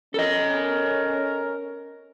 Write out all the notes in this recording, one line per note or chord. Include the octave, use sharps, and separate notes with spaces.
C#4 A4 A#4 D#5